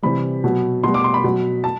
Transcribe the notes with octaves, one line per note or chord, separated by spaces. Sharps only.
C3 E3 G3 B5
B2 F#3
B2 G3 C6
D6
C6
B5
B2 F#3
A5